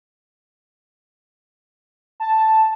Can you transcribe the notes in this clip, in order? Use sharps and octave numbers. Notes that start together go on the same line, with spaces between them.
A5